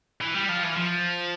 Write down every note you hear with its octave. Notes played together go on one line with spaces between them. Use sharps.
E3
G3
F3
E3
F3